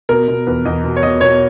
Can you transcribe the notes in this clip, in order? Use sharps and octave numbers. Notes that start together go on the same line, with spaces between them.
B2 A#4
B2
E2 B4
E2 D#5
B2
C#5
B2 D#5
B2 C#5